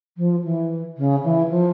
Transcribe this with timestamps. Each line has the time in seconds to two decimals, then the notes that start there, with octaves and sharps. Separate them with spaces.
0.17 F3
0.44 E3
0.97 C#3
1.24 E3
1.50 F3